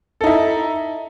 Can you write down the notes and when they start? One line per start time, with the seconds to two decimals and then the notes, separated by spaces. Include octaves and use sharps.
0.21 A4
0.24 D#4
0.27 E4